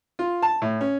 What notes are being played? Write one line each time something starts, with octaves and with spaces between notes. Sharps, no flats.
F4
A5
A2
C#4